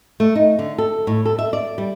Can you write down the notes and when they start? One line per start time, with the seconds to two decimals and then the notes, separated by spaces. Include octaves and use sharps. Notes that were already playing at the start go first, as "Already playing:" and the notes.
0.20 A3
0.35 D#4
0.59 D3
0.78 A4
1.07 A2
1.26 A4
1.39 E5
1.53 D5
1.78 G3